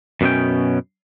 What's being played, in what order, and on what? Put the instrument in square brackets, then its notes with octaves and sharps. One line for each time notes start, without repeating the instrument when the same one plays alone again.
[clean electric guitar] F#2 B2 B3 C#4 G5